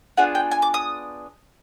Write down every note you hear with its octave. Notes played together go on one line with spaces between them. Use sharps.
B3 D4 F4 G#4 F#5
G5
G#5
D6
D#6